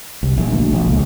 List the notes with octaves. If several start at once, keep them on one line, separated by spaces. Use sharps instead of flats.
C2
A#1
D2
A#1
C#2